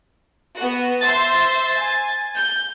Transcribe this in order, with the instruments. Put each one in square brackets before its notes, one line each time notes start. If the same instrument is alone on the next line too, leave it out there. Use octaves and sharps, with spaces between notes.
[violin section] B3 F#4
[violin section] C5 E5 C6 [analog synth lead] A6
[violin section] G#5
G6